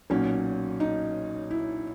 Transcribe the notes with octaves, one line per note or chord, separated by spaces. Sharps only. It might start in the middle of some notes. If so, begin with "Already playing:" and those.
B1 A#2 F#3 C#4
D#4
E4